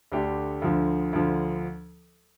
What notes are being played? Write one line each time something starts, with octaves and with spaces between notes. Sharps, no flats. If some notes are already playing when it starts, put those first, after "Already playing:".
D2 D3 A3 D4 G4
D2 D3 F3
D2 D3 F3